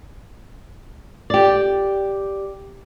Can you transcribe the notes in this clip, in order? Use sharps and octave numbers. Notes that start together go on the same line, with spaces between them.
G4 D5